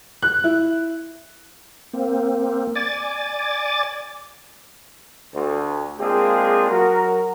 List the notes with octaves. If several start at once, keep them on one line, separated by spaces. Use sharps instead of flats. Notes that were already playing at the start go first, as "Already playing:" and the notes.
F#6
E4
A#3 C4
D5 G#5 D6 A6
D2
G#3 A#3 C4 D4 F4 G#4
F#3 F#4 A#4